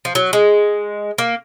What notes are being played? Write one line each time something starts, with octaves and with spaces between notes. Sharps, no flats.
F3
F#3
G#3
A#3